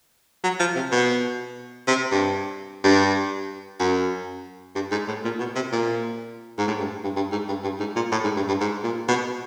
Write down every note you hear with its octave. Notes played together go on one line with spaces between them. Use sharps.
F#3
F3
C3
B2
C3
G2
G2
F#2
G2
G#2
A2
A#2
B2
C3
A#2
G#2
A2
G2
G2
G2
G#2
G2
G2
G#2
A#2
A2
G#2
G2
G2
G#2
A#2
B2